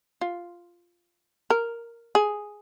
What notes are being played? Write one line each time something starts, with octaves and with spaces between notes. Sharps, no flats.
F4
A#4
G#4